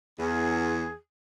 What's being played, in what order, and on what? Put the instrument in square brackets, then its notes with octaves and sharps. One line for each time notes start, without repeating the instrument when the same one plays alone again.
[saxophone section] E2 [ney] G#4